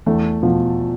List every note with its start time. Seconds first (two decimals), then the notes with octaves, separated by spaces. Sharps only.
0.06 E2 A3
0.42 B2 F3